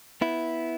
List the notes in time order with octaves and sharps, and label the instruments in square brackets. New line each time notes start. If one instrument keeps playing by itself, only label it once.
[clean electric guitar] B3 E4